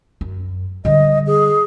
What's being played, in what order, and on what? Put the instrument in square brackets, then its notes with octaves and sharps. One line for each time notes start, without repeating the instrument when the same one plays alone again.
[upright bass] F#2
[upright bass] D3 G3 [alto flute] D#5
[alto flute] G#4